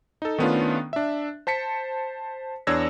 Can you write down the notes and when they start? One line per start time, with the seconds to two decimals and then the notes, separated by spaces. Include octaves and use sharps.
0.22 D#4 A4
0.38 D#3 A3 B3 C#4 D4 F4
0.93 D4 E5
1.47 C5 A5 B6 C#7
2.67 E2 D4 C#5 E6 G#6 A#6